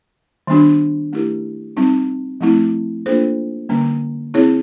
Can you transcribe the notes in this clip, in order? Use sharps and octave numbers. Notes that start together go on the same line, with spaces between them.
D#3 G3 B3 D4 F#4
A3 C#4 E4 G4 A#4
G3 C4 D#4
F3 A3 C4 E4
A#3 D4 F4 A4 C5
D3 G3 A#3 C#4
C4 E4 G#4 C#5